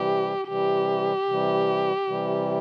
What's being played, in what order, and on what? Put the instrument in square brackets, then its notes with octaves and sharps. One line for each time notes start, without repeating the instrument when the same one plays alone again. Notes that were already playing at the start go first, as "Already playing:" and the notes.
Already playing: [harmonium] C3 E3 G3 [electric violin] G4
[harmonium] C3 E3 G3 [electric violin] G4
[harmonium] C3 E3 G3
C3 E3 G3